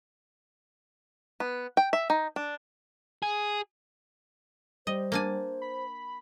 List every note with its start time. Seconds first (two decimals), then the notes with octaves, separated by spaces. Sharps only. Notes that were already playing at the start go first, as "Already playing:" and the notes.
1.40 B3
1.77 G5
1.93 E5
2.10 D#4
2.36 D4
3.22 G#4
4.87 G3 C5 D#5
5.12 A#3 D4 G#5
5.62 B5